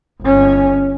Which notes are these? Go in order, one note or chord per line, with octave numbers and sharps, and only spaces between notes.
G1 C#4